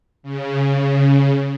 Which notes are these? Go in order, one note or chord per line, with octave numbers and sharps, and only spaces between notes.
C#3